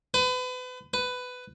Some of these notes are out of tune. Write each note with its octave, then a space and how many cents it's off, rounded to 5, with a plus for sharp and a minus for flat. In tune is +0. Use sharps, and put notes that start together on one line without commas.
B4 +35
B4 +15